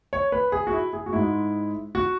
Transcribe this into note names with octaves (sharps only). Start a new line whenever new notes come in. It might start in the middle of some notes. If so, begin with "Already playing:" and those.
C#5
B4
G#4
F#4
E4
G#4
F#4
G#2 G#3 E4
F#4